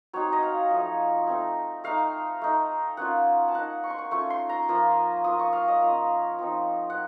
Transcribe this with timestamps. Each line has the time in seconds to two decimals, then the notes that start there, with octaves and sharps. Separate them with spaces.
0.13 F#3 C4 D#4 C#5
0.33 D#5
0.43 F5
0.71 F3 A3 D#4
1.27 A3 C4 D#4
1.84 A3 D#4 F5
2.41 A3 D#4
2.97 A#3 C#4 F4 F#5
3.48 A5
3.54 A#3 D#4 F#5
3.84 C#6
3.90 C6
3.98 C#6
4.11 A3 C#4 F4 C#6
4.30 C6
4.49 A#5
4.69 F3 A#3 F4
5.24 A#3 F4 D#6
5.39 C#6
5.53 F5
5.68 D#5
5.82 A#3 C#4 F4
6.39 F3 C4 D#4
6.90 F#5